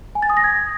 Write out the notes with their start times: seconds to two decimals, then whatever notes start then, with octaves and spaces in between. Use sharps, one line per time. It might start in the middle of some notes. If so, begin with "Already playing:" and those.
0.15 G#5
0.22 A6
0.30 D#6
0.37 A#6
0.44 G#6